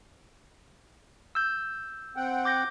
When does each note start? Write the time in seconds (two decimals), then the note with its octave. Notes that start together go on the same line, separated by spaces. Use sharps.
1.35 E6 G6
2.16 C4 F#5 G5
2.45 D6 G6 A#6